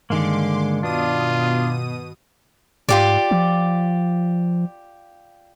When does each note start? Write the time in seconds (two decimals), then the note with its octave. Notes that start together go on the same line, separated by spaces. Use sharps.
0.10 G2 D3 D#3 G#3 A#3 C6 D6
0.83 B2 D4 F4 D#6 D#7
2.89 G#2 F4 G4 D5
3.31 F3